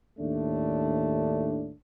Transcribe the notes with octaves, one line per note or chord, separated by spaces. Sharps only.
D#2 A2 A3 D4